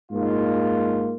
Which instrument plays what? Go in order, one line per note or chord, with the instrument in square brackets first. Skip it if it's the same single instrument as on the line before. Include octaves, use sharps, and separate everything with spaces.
[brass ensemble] G#2 A#3 D#4 F4